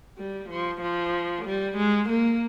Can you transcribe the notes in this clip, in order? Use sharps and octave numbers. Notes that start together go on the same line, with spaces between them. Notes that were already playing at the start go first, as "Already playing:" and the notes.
G3
F3
F3
G3
G#3
A#3